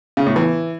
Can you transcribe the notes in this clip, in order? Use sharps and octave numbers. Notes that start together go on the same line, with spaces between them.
C#3
A2
E3